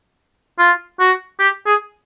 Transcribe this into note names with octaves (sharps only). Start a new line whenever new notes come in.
F4
F#4
G4
G#4